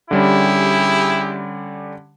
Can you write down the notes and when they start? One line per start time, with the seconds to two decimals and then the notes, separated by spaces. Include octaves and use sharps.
0.11 D3 G3 C#4 E4 G4 G#4